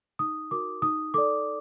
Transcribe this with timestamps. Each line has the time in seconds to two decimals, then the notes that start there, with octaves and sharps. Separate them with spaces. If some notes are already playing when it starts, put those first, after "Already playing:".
0.19 D#4 D#6
0.51 F#4 A#4 D6
0.82 D#4 D#6
1.14 A4 D5 D6